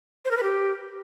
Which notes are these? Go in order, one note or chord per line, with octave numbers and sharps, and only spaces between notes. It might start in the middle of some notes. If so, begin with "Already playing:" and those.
C5
A#4
B4
G4